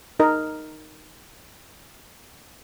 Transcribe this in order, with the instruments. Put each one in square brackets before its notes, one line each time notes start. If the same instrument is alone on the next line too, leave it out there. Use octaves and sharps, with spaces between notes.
[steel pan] D#4 A#4 D#5